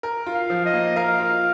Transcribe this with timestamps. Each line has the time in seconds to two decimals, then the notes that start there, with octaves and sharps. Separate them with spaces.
0.03 A#4
0.26 F4
0.34 F5
0.50 F3
0.66 D#5
0.73 A#3
0.96 A#4 F5
1.20 F4